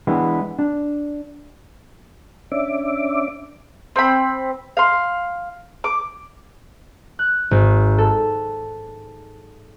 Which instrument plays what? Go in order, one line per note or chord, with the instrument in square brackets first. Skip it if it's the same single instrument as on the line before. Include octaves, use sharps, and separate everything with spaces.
[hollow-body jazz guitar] E3 G#3 B3 D4 E4
D4
[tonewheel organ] C#4 D4 E5 D6
[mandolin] C4 B5
F5 C6
D6
[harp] F#6
G#1
A4